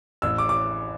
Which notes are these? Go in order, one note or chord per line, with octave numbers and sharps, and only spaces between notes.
A1 E6
D6
D6